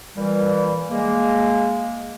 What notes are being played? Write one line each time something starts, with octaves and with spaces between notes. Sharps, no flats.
A#2 E3 G3
G#3 A#3